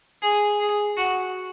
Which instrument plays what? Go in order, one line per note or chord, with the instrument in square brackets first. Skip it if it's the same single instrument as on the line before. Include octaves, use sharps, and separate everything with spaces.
[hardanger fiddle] G#4
G#4
F#4